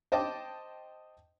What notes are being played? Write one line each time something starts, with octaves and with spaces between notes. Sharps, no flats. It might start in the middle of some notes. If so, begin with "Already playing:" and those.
C5 D#5 G5 A5 D6